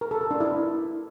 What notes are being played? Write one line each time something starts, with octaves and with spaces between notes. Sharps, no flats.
A#4
A4
A#4
D4
E4